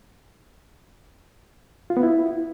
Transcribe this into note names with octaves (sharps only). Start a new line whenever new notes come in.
F4
B3
E4